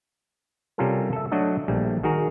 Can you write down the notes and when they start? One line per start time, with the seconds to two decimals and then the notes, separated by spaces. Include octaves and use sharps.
0.78 C3 G3 C#4 F4 A4 A#4
1.13 A4 E5
1.31 F#3 A3 D4 F#4 D#5
1.68 A#1 G3 A3
2.03 D#3 F#4 G#4 A#4